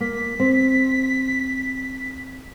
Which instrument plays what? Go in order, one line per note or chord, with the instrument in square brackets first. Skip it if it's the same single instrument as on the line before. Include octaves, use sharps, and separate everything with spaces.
[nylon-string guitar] A#3 [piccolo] B6
[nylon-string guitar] C4